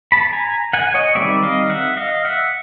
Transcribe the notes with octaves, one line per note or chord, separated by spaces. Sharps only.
A5 B5
G#5 A#5
F#5 G#5
C#5 D#5
D#3 G3 C4 D5 E5
D#5 F5
E5 F#5
D#5 F5
E5 F#5